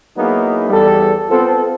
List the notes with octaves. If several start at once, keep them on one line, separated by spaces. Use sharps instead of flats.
F#3 A#3 B3 D#4 E4 G#4
E2 G3 A4
B3 C4 F4 A4